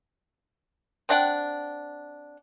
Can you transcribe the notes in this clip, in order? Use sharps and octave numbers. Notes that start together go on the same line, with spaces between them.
C4 D4 F#5 G5